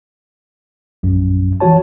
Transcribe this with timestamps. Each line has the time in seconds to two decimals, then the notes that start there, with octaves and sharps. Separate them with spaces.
1.03 A#1 F#2
1.60 E3 F3 F#4 C#5 A5